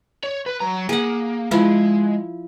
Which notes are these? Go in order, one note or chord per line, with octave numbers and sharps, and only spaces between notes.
C#5
B4
F#3 A#5
A#3 G#4 F#5
F3 G#3 E4